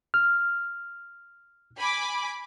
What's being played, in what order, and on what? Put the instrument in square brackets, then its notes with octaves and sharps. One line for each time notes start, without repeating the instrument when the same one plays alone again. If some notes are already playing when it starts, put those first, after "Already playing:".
[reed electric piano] F6
[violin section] G#5 B5 D6